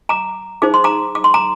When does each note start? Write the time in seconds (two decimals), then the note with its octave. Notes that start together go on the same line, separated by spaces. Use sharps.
0.09 A#5 D6
0.62 D#4 G#4 C5 D6
0.74 C6
0.84 A#5 D6
1.15 D6
1.24 C6
1.34 A#5 D6